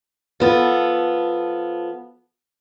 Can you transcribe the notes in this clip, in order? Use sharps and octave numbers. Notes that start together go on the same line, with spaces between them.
F3 B3 A4